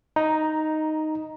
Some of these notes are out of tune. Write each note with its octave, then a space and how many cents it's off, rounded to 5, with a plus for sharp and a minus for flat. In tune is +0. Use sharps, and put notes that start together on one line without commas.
D#4 +0 A#5 +15